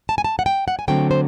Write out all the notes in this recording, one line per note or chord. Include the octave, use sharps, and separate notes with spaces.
A5
G#5
A5
F#5
G5
F#5
G#5
D3 F#3 A3 C4 G5
C5